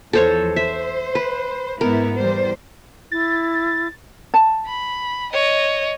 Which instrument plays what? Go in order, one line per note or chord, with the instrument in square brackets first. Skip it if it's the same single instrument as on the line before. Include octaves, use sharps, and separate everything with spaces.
[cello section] E2 F3 [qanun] A4 C5 C#5
[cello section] C5 [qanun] E5
[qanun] B4
[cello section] G#2 B3 E4 [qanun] A#4
[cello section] E2 G3 C5
[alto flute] E4 [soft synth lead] A6
[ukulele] A5
[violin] B5
C#5 D#5